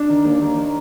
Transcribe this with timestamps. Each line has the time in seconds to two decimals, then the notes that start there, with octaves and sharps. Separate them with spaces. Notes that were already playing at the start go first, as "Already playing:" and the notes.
Already playing: D4
0.09 D#3
0.25 D#2
0.42 D#2
0.58 D#3